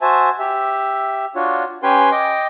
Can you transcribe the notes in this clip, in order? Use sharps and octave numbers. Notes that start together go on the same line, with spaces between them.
F#4 C5 E5 G#5 A5
G4 E5
D4 F4 F#4 C#5
C#4 G4 B4 G5 G#5 C6
D#5 G5 D6